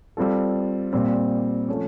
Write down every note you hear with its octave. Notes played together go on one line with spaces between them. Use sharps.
G3 C4 F4 A4
A#2 G3 C4
F3 A3 C#4